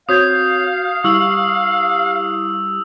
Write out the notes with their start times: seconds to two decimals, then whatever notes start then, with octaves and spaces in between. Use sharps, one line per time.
0.09 C4 F#4 C#5 F5 D#6 G6 G#6
1.04 G3 E4 G4 C#6 E6 F#7